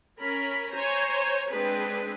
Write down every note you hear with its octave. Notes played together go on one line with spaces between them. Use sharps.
C#4 A#4 B5
C5 C#5 G#5 A#5
G#3 C4 D4 G#4 B4